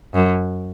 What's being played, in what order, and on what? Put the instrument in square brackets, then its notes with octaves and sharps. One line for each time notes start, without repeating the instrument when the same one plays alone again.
[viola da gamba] F#2